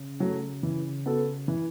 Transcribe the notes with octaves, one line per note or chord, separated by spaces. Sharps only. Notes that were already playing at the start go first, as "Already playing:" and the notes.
Already playing: C#3
F#3 A3
E3
B3 F#4 A4
E3